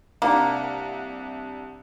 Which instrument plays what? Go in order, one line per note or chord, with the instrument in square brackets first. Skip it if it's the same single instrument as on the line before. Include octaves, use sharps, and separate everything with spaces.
[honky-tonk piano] C2 D4 F#5 [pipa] A#3